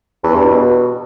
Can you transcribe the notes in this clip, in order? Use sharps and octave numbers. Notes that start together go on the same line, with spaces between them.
E2
G2
B2